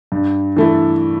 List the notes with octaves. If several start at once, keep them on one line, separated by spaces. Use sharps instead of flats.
G2
E3 A3 E4